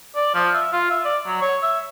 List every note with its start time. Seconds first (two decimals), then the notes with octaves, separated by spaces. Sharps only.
0.16 D5
0.35 F3
0.54 E5
0.72 F4
0.90 E5
1.05 D5
1.26 F#3
1.41 C#5
1.62 E5